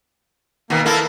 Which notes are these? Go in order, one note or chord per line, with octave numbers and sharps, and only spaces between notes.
B2 D#3 A#3
A#3 E4 A4 A#4